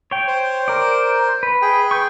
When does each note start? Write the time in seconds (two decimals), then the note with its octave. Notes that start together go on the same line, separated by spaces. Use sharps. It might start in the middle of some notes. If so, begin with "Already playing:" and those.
0.11 C#5 G5
0.28 C5
0.68 A#4 D5
1.43 B4
1.62 G#4 G5
1.91 C#6 G6